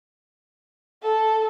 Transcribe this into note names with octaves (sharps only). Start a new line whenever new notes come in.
A4